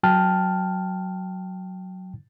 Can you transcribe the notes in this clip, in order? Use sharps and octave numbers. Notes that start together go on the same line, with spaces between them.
F#3 G5 A5 F6